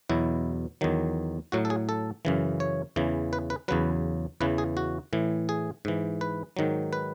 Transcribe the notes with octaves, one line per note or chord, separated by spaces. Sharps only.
E2 B2 F#3 E4
E2 D#3 F#3
A2 F#3 F#4
A4
G#4
A4
F#2 C#3 E3
C#5
E2 C#3 E3
B4
B4
E2 C#3 F#3 B4
E2 C#3 E3 B4
G#4
F#4
A2 E3
G#4
G#2 E3
B4
G#2 D#3 F#3
B4